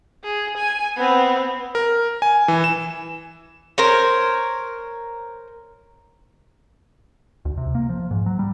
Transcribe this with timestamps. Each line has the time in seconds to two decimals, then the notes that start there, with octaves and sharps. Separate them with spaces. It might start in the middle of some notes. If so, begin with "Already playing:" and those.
0.24 G#4
0.57 G#5
0.96 B3 C4
1.75 A#4
2.22 G#5
2.48 E3
2.64 E7
3.78 A#4 C5 C#5
7.45 D2
7.57 C3
7.75 A#3
7.89 F3
8.11 G#2
8.26 F#3
8.39 G3